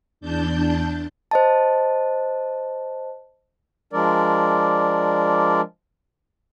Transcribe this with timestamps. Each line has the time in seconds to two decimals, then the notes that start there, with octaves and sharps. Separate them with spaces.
0.21 E2 D4 A5 G6
1.31 C5 D#5 A5
3.93 F3 G#3 D4 A#4 D5